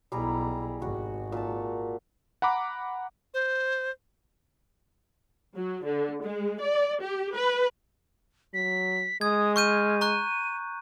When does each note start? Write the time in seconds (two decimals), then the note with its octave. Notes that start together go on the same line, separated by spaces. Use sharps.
0.12 B1 G3 E4 G#4 A#5
0.82 G#1 F#4
1.32 A#2 A5
2.42 F#5 A#5 B5 D6
3.34 C5
5.56 F#3
5.86 D3
6.23 G#3
6.62 D5
7.02 G4
7.35 B4
8.54 F#3 B6
9.21 G#3 D#6 G#6
9.56 C#6 F6 G6 D#7
10.01 A#5 C#6 F#6 D#7